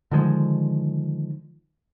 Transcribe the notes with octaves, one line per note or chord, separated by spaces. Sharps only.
D3 D#3 F3 G#3